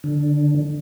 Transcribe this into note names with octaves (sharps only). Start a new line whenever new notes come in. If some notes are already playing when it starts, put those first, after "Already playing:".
D3